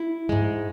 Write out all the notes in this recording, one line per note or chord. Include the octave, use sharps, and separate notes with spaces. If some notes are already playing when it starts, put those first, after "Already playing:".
Already playing: E4
G#2 G#3